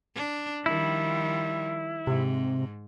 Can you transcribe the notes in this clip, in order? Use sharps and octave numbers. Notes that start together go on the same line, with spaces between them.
D4
D#3 F3 G3 E4
G#2 C3